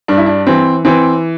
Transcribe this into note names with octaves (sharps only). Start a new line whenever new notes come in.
G2 D4
E4
D4
E3 C4
E3 C4